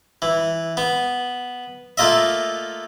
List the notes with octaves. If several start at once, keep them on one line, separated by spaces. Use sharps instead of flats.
E3
B3
A3 A#3 F4 D#5 E5